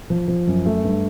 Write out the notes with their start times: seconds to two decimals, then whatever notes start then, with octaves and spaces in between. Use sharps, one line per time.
0.10 F3
0.28 F3
0.47 F#2
0.66 A3
0.84 G2